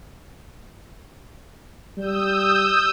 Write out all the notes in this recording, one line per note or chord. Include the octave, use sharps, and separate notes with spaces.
G3 D#6 E6 G6